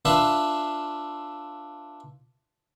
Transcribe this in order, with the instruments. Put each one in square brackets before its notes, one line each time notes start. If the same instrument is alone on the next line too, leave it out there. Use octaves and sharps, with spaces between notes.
[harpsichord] D4 F4 B4 E5